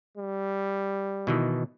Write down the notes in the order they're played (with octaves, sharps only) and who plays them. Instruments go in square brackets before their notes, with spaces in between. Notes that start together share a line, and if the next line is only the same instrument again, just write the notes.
[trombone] G3
[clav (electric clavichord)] B2 D#3 E3